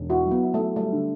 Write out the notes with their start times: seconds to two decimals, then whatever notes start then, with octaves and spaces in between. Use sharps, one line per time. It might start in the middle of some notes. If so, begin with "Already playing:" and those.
Already playing: E1
0.09 E4 F#4
0.27 F#3 B3
0.43 E4
0.54 F#3 A3
0.76 G3 A3
0.92 D3